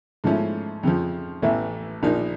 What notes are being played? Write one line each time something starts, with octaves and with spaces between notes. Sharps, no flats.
G#2 F3 A3 C#4 E4
F2 C#3 F3
A1 A2 E3 A3
A#1 A#2 F3 A#3 D#4